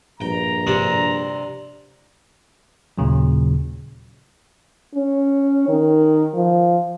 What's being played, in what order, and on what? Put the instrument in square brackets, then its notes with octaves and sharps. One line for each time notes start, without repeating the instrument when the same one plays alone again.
[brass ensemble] A#1 G2 A#5 [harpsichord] G5
[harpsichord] C3 C4 D4
[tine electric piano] D#2 A#2 C#3 F#3
[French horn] C#4
D#3
F3